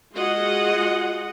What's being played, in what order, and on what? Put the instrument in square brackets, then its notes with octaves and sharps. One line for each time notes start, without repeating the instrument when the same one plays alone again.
[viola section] G#3 F4 F#4 G#4 D#5 F#5